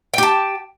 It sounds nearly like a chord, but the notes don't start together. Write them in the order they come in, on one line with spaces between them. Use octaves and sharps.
G5 G4 A5